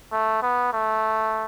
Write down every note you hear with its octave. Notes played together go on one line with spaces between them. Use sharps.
A3
B3
A3